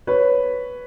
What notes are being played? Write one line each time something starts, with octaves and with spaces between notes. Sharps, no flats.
B4 C#5